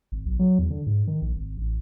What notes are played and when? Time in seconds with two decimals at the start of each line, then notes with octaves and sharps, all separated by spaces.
0.12 G#1
0.26 B1
0.39 F#3
0.59 E2
0.70 D3
0.87 G#2
1.07 D#3
1.22 A#1
1.36 G#1
1.57 A1